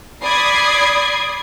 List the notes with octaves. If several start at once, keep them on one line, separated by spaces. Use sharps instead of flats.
D5 B5 D#6 G#6 C7